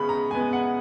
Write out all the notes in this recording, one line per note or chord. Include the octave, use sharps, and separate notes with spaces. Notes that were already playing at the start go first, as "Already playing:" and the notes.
Already playing: C#3 G#3 B3 B5
A#5
G#3 B3 G#5
F#5